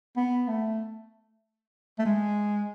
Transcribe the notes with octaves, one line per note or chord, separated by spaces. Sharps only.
B3
A3
A3
G#3